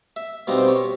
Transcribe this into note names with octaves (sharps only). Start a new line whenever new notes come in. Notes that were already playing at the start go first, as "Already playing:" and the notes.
E5
B2 G3 C4 D#4 F5
C5
C#5